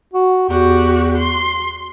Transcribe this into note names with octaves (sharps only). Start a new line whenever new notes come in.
F#4
E2 F#4 G4
C6